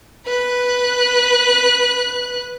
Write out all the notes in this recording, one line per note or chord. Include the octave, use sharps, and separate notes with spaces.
B4 F#6